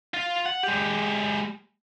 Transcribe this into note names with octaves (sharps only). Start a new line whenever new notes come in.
F4
F#5
G#3 G4